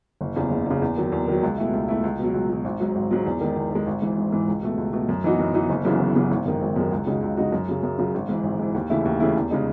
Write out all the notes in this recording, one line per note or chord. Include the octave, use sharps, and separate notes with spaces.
F#1
E2 C#3
F#1
E2 C#3
E2
D#3 F#3
E2
D#3 F#3
C#2
B2 A3 E4
C#2
B2 A3 E4
C#2
B2 F#3
C#2
B2 F#3
G#1
G#2 F#3
G#1
G#2 F#3
E2
D#3 G#3
E2
D#3 G#3
G#1
G#2 E3
G#1
G#2 E3
C#2
B2 A3
C#2
B2 A3
F#2
E3 B3 D#4 F#4
F#2
E3 B3 D#4 F#4
F#1
F#2 C#3 E3 B3
F#1
F#2 C#3 E3 B3
G#1
F#2 D#3 G#3
G#1
F#2 D#3 G#3
C#2
C#3 G#3 D#4 F#4
C#2
C#3 G#3 D#4 F#4
F#2
C#3 F#3
F#2
C#3 F#3
G#1
G#2 E3
G#1
G#2 E3
D#2
C#3 E3 A3 E4
D#2
C#3 E3 A3 E4
E2
C#3 G#3 D#4